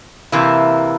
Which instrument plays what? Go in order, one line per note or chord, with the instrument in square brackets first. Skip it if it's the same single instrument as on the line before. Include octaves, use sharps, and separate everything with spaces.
[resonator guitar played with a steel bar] C3 E3 A#3 E4